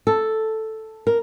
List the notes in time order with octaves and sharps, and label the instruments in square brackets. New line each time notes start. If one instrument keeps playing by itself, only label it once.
[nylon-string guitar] A4
A#4